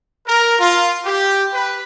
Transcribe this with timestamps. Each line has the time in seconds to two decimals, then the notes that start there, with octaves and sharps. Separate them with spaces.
0.25 A#4
0.58 F4
1.05 G4
1.53 B4